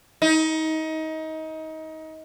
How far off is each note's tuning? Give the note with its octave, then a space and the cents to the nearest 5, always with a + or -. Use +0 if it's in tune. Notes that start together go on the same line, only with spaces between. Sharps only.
D#4 +25